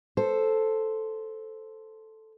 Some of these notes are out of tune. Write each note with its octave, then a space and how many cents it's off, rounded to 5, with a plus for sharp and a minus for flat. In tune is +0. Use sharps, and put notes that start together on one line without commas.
A4 +0 C5 +0